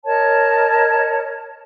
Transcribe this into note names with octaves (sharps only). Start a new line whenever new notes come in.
A#4 C#5 D#5 A5